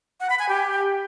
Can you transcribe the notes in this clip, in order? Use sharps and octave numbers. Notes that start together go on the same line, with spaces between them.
F#5
B5
G#5
G4